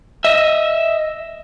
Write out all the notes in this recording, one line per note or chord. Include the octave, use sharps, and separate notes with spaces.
D#5 E5